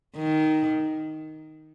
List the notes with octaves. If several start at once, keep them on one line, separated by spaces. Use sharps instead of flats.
D#3